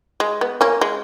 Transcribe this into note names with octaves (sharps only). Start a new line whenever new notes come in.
G#3
B3
A#3 C#4
G#3